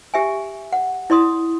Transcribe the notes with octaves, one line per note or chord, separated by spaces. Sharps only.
G4 E5 G#5
F#5
E4 D5 C6 D#6